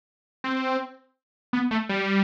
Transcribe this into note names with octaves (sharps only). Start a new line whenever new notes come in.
C4
B3
A3
G3